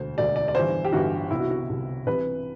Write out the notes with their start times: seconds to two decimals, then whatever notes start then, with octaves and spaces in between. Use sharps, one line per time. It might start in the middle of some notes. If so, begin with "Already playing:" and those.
Already playing: E1 D2 D3 C5
0.17 E1 D2 D3 D5
0.36 D5
0.48 D5
0.55 G1 G2 E3 C5
0.85 G4
0.92 G1 G2 E3 F#4
1.31 C2 B2 E4
1.40 F#4
1.50 F#4
1.69 C2 B2
2.06 C2 C3 E3 B4